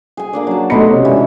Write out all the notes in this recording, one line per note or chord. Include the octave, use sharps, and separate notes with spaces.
G#4 G#5
A#3 D4 D5
F#3 A5
B2 A3 D#4 B5 C6 C#7
C3 C#4
E3 G#3 C#4 D4 E4